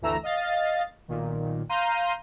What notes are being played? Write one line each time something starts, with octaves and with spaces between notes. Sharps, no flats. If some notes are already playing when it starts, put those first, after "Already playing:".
G1 D2 E3 A3 A#5 E6
D#5 F5 A6
B1 A#2 D#3
F5 A#5 C6 G6 D#7